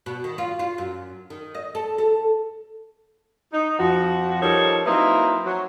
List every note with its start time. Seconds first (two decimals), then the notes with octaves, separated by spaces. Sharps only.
0.06 B2
0.24 D#3
0.38 F4
0.59 F4
0.78 F#2
1.30 D#3
1.55 D#5
1.75 A4
1.98 A4
3.53 D#4
3.79 F2 F3 F#4
4.42 F3 G3 D#4 A4 A#4 C#5
4.86 F#3 A#3 C4 D#4 E4 B4
5.46 F#3